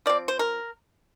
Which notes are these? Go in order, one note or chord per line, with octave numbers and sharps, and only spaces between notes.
F3 C4 D5
C5
A#4